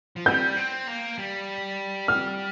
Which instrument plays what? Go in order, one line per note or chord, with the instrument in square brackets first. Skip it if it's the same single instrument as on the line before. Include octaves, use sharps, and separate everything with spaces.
[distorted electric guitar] F3
[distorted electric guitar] G3 [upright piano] G6
[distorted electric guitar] C4
A#3
G3
[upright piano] F6